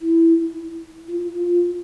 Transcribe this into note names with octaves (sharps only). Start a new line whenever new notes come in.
E4
F4
F4